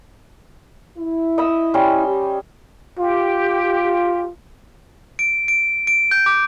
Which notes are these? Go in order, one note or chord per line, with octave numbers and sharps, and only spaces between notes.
E4
D#5 B5 E6
G3 C#4 C6
G4
F4 G4
D7
D7
D7
G6
D6